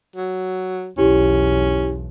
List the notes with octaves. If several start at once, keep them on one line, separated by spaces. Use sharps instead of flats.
F#3
B1 E2 C#4 E4 G4